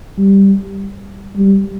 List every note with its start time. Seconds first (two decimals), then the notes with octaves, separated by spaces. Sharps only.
0.18 G3
1.36 G3